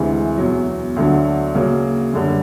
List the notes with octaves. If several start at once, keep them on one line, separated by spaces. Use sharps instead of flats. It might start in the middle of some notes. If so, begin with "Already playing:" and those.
Already playing: D2 C3 E3 G#3
E2 B2 F#3
D2 D3 F#3
C#3 F#3 A#3
F#2 D3 G3